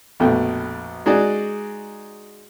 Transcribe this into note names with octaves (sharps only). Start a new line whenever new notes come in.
A#1 F2 B2 A3 G5
G#3 D#4 F#4 G#4 D5